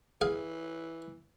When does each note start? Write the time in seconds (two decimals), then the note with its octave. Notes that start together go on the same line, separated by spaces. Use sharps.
0.21 E3 G#4 F5